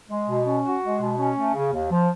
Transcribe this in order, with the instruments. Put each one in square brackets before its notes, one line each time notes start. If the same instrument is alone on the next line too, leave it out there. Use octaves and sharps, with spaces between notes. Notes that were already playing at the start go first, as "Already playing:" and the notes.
[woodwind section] G#3
B2
C#4
F#4
G#3
B2
C#4
A3
C#3
D#2
F3